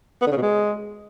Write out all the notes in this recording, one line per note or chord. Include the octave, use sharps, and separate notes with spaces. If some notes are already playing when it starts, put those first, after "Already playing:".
B3
D3
C#3
B2
G#3